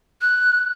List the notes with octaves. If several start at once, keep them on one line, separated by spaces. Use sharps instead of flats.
F#6